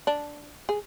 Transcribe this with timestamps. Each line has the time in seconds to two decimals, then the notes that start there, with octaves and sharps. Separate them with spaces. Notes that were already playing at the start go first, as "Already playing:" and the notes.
0.07 D4
0.69 G#4